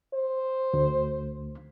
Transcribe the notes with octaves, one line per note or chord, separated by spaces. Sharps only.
C5
D2